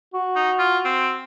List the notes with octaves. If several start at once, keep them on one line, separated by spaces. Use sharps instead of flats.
F#4
D#4
F4
C4